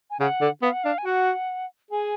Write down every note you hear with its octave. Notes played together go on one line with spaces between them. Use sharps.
G#5
C#3 F#5
D3
B3 F5
F#5
D4 F5
G#5
F#4 F#5
G#4 G#5